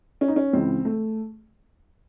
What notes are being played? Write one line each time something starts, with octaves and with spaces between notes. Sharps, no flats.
C#4
D#4
C#4
C#2 C#3 E3 C4
A3